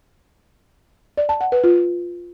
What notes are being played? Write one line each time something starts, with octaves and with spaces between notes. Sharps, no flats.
D5
A5
F#5
B4
F4